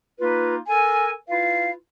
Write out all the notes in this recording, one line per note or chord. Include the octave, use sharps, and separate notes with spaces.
A#3 D#4 F4 B4
A4 A#4 G#5
E4 F4 B4 F5